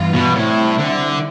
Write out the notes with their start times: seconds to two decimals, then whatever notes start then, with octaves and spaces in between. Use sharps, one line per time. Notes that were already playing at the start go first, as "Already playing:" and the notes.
Already playing: G2 E3 B3 F4
0.13 B2
0.35 A2 C3 G3 C4 E4
0.78 D3